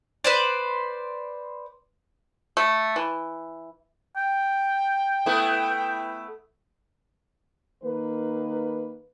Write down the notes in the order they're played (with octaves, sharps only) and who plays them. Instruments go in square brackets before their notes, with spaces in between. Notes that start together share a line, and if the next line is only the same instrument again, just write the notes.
[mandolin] B4 C5 D5
[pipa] A3
E3
[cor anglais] G5
[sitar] A3 B3 E4
[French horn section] D#3 A#3 B4